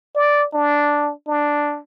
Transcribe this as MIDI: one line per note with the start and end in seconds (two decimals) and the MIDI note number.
0.15 0.46 74
0.54 1.12 62
1.27 1.79 62